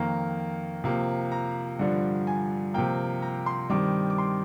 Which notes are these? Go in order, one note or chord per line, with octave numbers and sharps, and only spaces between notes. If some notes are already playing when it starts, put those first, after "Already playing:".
Already playing: F2 D#3 A#3 A#5
C3 F3 A#3
A#5
G2 D3 F3
G#5
C3 F3 A#3 G5
A#5
C6
G2 D#3 G3 C4 D6
D6
C6